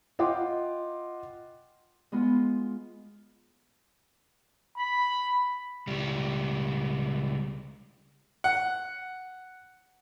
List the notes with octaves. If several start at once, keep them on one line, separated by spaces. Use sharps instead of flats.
F4 D#5 F#5 G5 C6 D6
G#3 B3 F4
B5
C#2 G3
F#5